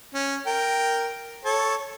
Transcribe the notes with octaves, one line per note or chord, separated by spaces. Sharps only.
C#4
A#4 G5
A4 C#5 A5